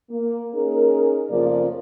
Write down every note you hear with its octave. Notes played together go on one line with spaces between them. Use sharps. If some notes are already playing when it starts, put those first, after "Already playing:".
A#3
A#3 C#4 D#4 G#4 A#4
F2 C#3 F3 A3 A#3 D5